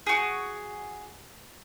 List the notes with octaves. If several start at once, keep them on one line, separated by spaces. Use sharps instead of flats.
F#4 G#4